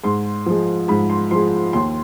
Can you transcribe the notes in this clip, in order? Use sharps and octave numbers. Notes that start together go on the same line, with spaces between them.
G#2 C6
F3 G#3
G#2 B5
C6
F3 G#3 C6
D#2 C6